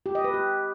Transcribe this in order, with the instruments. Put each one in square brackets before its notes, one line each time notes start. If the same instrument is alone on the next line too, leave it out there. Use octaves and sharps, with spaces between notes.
[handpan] G4
D#5
B4
G4